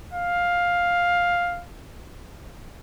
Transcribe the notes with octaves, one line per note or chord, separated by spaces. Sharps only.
F5